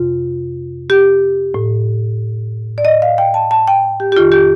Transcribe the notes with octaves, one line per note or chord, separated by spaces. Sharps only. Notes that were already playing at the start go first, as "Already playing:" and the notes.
Already playing: F2 C3 F4
G4
A2
D5
D#5
F5
G5
A5
A5
G5
G4
G4
F2 D#3 F4
G4